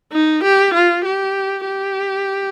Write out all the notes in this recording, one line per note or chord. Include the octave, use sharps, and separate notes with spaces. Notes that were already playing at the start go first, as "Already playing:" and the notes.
D#4
G4
F4
G4
G4